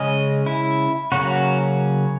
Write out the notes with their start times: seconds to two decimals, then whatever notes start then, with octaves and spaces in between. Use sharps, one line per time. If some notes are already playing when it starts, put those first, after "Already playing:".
Already playing: C#3 G#3 C#4 D#5
0.46 E4
1.12 C#3 F#3 A#3 C#4 F#4